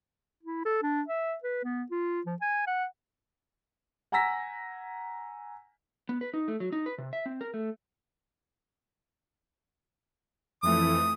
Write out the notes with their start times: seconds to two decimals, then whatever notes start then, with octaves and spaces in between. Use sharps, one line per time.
0.43 E4
0.65 A4
0.83 D4
1.08 E5
1.43 B4
1.64 B3
1.91 F4
2.26 F3
2.41 G#5
2.67 F#5
4.12 F#5 G#5 A#5 E6 A#6 B6
6.09 B3
6.21 B4
6.34 D#4
6.48 A3
6.60 F#3
6.72 D#4
6.86 B4
6.98 C3
7.13 E5
7.26 C4
7.41 A#4
7.54 A3
10.63 F2 E3 A3 D#6